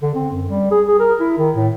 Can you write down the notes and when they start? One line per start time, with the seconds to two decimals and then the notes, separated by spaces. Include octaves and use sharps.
0.02 D3
0.14 C4
0.32 F#2
0.49 G3
0.71 G#4
0.87 G#4
0.99 A#4
1.20 E4
1.38 D#3
1.56 A2